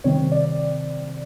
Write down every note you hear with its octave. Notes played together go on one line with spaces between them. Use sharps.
C3 D#3 G3 C4 C#5
D5